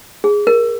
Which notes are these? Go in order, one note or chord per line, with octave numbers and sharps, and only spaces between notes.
G#4
A#4